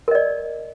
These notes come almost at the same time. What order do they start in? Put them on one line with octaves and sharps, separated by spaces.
A#4 D#5 D5